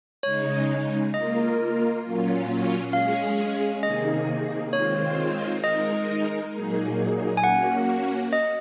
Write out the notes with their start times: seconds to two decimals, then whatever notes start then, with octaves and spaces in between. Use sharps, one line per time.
0.23 C#3 G#3 D#4 C#5
1.14 A#3 F4 A#4 D#5
2.03 A#2 F#3 C#4 F4
2.93 G#3 C#4 G#4 F5
3.83 C3 D#3 A#3 D#4 G#4 D#5
4.73 D#3 G#3 C4 F4 C5 C#5
5.63 G#3 D#4 A#4 D#5
6.54 A#2 F#3 A#3 D#4 G#4
7.37 G#5
7.43 A#3 C#4 F#4 F#5
8.33 D#5